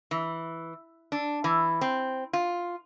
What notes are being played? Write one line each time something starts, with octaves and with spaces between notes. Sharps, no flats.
E3
D4
E3
C4
F4